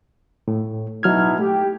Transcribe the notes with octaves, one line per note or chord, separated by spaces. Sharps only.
A2
B2 F#3 D#4 E4 F6 G#6
A3 G4